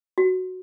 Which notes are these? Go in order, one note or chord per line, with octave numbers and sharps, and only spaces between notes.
F#4